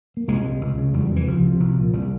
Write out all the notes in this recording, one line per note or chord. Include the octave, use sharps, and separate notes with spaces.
A#3
C2 G#3
C3
C#2
C#3
E2 G3
G3
C3
E3
C#2 F3
C3
C2
A#2
C2 G3